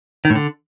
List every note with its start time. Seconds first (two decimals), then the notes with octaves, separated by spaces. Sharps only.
0.25 D#3
0.30 A2
0.35 D3